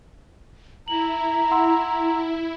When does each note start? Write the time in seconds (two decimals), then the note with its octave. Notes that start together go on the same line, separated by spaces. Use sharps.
0.88 E4 A#5 F#7
1.51 F#5 C6 E6